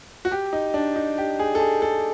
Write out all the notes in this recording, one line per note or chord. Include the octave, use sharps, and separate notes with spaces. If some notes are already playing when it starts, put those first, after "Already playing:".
F#4
G4
D#4
D4
D#4
G4
G#4
A4
G#4
A4